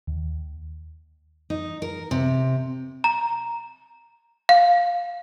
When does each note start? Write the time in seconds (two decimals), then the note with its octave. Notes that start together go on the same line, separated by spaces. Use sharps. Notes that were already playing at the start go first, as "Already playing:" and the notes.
0.07 D#2
1.50 D#4
1.82 A#4
2.11 C3
3.04 A#5
4.49 F5